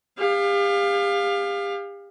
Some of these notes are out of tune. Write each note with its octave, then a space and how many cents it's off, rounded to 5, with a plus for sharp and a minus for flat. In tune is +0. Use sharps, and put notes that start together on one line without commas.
G4 +40 F5 +10